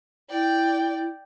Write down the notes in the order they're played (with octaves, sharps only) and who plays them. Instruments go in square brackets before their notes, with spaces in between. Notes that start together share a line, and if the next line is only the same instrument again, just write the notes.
[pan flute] E4 [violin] D5 G5